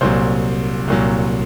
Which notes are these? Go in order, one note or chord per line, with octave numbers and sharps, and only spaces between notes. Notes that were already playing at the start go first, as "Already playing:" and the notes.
C2 A#2 F#3 C5
C2 A#2 F#3